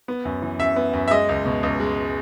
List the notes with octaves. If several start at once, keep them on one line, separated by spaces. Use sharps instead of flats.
B3
F#2
E3
F#2 E5
B3
F#2
E5
G#3 D#5
C#2
B2
C#2
G#3